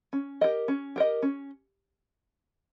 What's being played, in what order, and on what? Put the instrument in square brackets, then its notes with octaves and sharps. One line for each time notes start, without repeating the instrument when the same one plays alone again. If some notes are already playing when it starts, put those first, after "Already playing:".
[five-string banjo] C#4
G4 A#4 D#5
C#4
G4 A#4 D#5
C#4